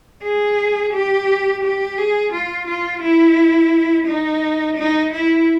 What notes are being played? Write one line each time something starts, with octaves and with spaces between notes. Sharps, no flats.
G#4
G4
G4
G#4
F4
F4
E4
D#4
D#4
E4